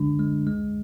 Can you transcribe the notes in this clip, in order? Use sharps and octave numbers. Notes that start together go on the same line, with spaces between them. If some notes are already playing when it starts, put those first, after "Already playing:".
Already playing: D3 G#3 D4
G#3
G#3